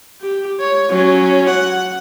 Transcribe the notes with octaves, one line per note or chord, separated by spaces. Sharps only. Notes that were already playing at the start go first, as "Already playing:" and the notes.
G4
C#5
F#3 C#4
F#5